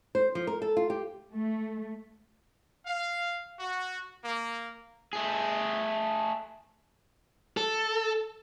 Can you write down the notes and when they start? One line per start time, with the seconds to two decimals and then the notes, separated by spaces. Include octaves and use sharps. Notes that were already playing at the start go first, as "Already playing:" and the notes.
0.15 C5
0.35 F3
0.47 A#4
0.62 A4
0.77 F4
0.90 G4
1.31 A3
2.86 F5
3.59 F#4
4.24 A#3
5.13 A3 G#4
7.57 A4